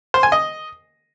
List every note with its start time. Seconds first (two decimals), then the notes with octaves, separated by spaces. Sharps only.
0.14 C5
0.23 G#5
0.32 D#5